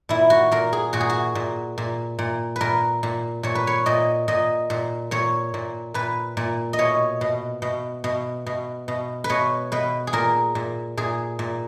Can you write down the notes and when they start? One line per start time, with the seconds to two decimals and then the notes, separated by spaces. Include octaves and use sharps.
0.09 A#2 E4
0.30 F#4
0.51 A#2 A#4
0.73 G#4
0.93 A#2 F#4
1.01 G#4
1.10 F#4
1.35 A#2
1.78 A#2
2.19 A#2
2.56 A#2 A#4 B4
3.03 A#2
3.43 A#2 C#5
3.55 B4
3.67 C#5
3.86 A#2 D#5
4.28 A#2 D#5
4.70 A#2
5.11 A#2 C#5
5.54 A#2
5.94 A#2 B4
6.37 A#2
6.73 D#5
6.79 B2 C#5
7.21 B2
7.62 B2
8.04 B2
8.46 B2
8.88 B2
9.24 B4
9.30 B2 C#5
9.72 B2 B4
10.07 G#4
10.13 A#2 A#4
10.55 A#2
10.97 A#2 G#4
11.39 A#2